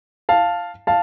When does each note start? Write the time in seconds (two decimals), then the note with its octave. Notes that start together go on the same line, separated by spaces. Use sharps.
0.29 F5 A5
0.87 F5 A5